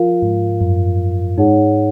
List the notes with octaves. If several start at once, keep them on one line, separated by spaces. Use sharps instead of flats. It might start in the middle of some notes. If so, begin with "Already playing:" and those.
Already playing: F3 F4 A#4 F5
G#2
F#2
G#2 D#4 G#4 C#5 F#5